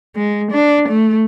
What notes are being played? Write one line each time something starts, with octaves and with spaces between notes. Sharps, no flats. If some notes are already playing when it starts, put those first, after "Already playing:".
G#3
D4
A3